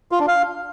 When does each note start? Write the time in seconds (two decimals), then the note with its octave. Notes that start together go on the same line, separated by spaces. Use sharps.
0.12 F4
0.20 D4
0.28 F5